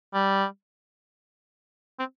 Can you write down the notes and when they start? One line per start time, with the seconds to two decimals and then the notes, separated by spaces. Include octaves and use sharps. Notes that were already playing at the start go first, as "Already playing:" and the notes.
0.14 G3
1.99 C4